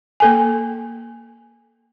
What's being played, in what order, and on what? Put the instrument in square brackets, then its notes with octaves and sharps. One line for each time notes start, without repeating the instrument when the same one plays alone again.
[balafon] A#3 A4 G#5